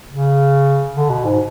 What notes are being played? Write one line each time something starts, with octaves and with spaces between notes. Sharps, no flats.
C#3
D3
B2
G#2